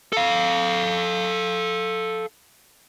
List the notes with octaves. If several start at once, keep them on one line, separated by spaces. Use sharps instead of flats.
A4 F5